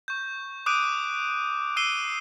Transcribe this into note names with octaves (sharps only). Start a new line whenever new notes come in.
C#6 G6
D6 D#6 F#6 G6 D7 D#7
D6 E6 C7 D#7 G7